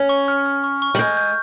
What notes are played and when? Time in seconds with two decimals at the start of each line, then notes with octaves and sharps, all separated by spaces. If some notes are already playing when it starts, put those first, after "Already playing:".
Already playing: C#4
0.09 C#6
0.28 F6
0.46 F6
0.64 C#6
0.82 C#6
0.95 G3
0.99 G#3 G6
1.17 G6